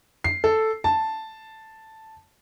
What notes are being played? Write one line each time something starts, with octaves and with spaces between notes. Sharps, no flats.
C7
A4
A5